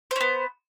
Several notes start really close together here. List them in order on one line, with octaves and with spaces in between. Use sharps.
C5 C#4 B3